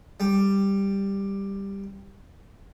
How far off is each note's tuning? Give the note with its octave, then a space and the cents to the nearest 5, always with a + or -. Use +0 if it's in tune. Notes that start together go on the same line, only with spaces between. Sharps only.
G3 +5